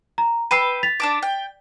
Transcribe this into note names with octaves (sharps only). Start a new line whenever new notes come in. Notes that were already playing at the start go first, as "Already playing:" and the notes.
A#5
B4 G5 B5 E6 C7 D#7
A6 B6 F7
D4 A5 D6
G5